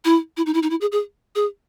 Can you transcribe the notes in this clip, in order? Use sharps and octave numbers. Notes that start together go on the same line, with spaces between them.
E4
E4
D#4
E4
D#4
E4
G#4
G#4
G#4